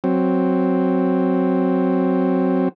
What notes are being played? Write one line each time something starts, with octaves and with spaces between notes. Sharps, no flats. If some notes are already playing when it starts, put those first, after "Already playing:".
F#3 C4